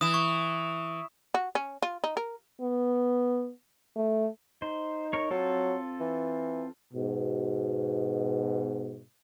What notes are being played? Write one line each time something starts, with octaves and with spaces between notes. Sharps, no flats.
E3 D#6 E7
C#6
F#4
C#4
F4
D#4
A#4
B3
A3
D#4 C5
A#4 C#5
F#3 C4 F4 A4
E3
G#2 B2